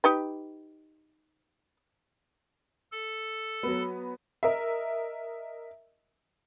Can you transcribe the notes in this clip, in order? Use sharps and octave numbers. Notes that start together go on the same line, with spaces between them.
D#4 G4 B4
A4
F#3 B3
A#4 D#5 E5